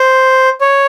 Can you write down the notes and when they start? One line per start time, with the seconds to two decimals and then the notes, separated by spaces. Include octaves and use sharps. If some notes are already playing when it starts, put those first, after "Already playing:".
Already playing: C5
0.61 C#5